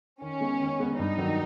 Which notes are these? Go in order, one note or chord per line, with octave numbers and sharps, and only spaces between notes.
D#3 C#4
G#3 B3
D#3
G#3 B3
G2 D#4
D#3 F#3